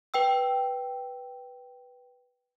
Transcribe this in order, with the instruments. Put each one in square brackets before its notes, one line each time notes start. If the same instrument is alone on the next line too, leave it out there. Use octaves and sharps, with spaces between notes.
[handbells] B4 G5 E6